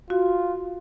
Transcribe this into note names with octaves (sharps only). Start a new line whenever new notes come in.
F4 F#4